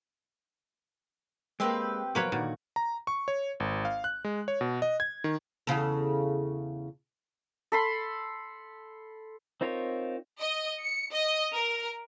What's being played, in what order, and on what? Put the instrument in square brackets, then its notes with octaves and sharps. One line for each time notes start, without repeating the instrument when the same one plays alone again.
[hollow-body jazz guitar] G#3 A#3 [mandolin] C4 G4 B4
[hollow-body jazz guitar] B2 F3 F#3 [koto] A#3 B4 C#5 [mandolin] D6
[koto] A#2 [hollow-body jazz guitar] D3 D#3 F#4
[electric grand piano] A#5
C#6
C#5
G#1
F5
F#6
G#3
C#5
B2
D#5
G#6
D#3
[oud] E2 C#3 A4
[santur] A4 B5 C6
[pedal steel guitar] C4 D#4 F4 A#4 C#5
[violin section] D#5
C#7
D#5
A#4